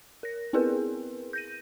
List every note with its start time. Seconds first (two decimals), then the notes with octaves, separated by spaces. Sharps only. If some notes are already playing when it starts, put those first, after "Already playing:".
0.23 A#4 A#6
0.53 B3 C4 E4 G#4 A#4 B4
1.33 G6 A#6 D#7